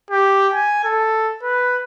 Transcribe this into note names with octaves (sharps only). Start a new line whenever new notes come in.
G4
G#5
A4
B4